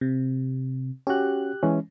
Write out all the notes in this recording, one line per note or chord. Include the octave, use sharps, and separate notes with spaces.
C3
C#4 F#4 G4 F#6
E3 G#3 C#4